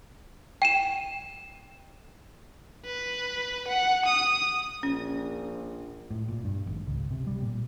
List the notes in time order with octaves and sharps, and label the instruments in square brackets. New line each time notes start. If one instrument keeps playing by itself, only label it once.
[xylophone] G5 D#7 E7
[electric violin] B4
F#5
D#6
[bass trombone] A#1 [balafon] C#4
[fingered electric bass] A2
A#2
G2
G#1
C#2
C3
G3
A#2